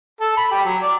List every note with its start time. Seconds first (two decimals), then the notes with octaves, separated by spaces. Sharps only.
0.21 A4
0.37 B5
0.51 G4
0.65 F#3
0.82 D5